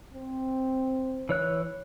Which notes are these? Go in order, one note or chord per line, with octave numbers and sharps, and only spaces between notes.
C4
E3 C#5 F#6